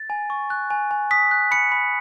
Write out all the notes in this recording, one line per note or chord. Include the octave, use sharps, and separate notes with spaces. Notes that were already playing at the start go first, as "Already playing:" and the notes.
Already playing: A6
G#5
C#6
F#6
G#5
G#5
D#6 B6
F#6
B5 C#7
B5